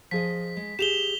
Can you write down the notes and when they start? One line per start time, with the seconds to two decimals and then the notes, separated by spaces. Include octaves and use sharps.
0.11 F3 G#4 D#5 B6
0.57 G#3
0.79 G4 G#4 E7 F7 G7